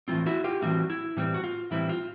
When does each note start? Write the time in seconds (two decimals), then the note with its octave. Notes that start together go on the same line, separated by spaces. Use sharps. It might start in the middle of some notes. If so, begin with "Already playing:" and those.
0.08 A2 E3 G3 C4 F4
0.26 E4 F#4
0.44 F4 G4
0.62 A2 E3 G3 C4 E4 F#4
0.90 E4
1.17 A2 E3 G3 C4
1.34 F#4
1.44 F4
1.71 A2 E3 G3 C4 E4
1.89 F4